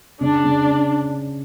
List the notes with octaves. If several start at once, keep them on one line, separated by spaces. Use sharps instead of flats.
C#3 D4
C#3
C#4